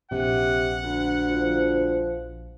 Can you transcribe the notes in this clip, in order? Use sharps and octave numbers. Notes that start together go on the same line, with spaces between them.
A#1 C3 F#5
D2
F3